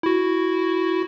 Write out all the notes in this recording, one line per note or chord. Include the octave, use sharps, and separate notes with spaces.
E4 F#4